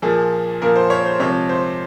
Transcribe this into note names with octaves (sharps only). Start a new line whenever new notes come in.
A#2 F3 A#3 G#4
A#2 F3 A#3 A#4
C5
C#5
C5
C3 F3 G#3 C#5
C5